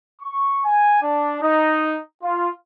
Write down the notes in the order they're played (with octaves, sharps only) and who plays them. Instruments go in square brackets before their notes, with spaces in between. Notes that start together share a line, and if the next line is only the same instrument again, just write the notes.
[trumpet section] C#6
G#5
D4
D#4
F4